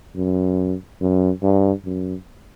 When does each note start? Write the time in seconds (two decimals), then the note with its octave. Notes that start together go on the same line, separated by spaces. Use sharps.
0.16 F#2
1.01 F#2
1.43 G2
1.85 F#2